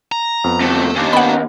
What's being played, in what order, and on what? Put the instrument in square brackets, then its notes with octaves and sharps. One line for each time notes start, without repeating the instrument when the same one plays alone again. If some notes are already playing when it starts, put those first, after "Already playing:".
[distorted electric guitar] A#5
[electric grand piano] F2 B3
[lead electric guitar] D2 C3 [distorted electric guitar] A3
[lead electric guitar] D#2 [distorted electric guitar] C#4 D4
[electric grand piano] B3 D#5 [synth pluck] F#5 B5